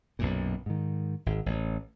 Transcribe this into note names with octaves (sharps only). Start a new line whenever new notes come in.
B1 F#2 A#2
G#2 D#3
G#1
A1